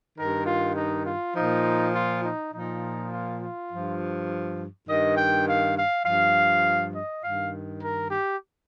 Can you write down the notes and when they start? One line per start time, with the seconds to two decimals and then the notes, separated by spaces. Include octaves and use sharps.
0.17 G2 D#3 A#4
0.46 F4
0.76 D#4
1.05 F4
1.34 A#2 F3 D#4
1.93 F4
2.23 D#4
2.52 A#2 F3 D#4
3.11 F4
3.41 F4
3.70 G2 F3
4.87 G2 D#3 D#5
5.16 G5
5.47 F5
5.76 F5
6.04 G2 F3 F5
6.93 D#5
7.23 G2 D#3 F5
7.82 A#4
8.10 G4